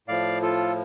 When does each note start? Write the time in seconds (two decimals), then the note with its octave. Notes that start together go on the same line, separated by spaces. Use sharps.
0.08 A2 F3 D5 F5
0.42 F4 A4